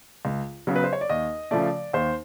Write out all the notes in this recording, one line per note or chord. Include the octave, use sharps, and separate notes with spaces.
C#2
C#3 F#3 B3
B4
C5
C#5
D5
D#2 D#5
C#3 F3 A3 D5
D#2 C5